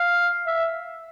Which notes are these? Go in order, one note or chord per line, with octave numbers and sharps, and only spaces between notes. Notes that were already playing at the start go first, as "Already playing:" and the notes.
Already playing: F5
E5